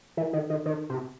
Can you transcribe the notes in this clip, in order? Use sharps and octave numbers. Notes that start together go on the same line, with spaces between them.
E3
D#3
D#3
D#3
C3